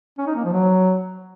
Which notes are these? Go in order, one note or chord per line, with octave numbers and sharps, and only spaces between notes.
C#4
D#4
A#3
F3
F#3